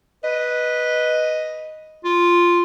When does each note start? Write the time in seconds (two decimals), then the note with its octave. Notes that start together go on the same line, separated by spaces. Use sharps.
0.24 B4 D#5
2.04 F4